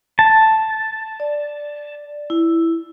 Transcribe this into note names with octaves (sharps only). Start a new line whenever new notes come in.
A5
D5
E4